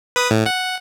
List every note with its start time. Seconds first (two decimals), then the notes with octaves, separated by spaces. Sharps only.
0.16 B4 D#6
0.31 A2
0.46 F#5